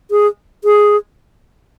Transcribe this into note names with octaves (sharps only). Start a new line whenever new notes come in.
G#4
G#4